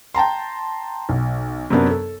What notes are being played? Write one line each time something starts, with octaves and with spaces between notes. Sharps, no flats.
G5 A5 A#5 C6
B1
F#2 C3 F#3 B3 D4 A#4
A4